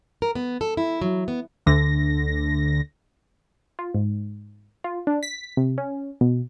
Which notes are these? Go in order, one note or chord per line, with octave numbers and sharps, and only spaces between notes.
A#4
B3
A4
E4
F#3
B3
D2 D3 A#6
F4
G#2
F4
D4
B6
C3
C#4
B2